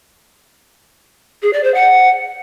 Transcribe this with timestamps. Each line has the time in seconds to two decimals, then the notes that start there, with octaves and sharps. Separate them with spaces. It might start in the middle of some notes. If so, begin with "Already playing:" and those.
1.43 G#4
1.53 D5
1.64 C5
1.74 F#5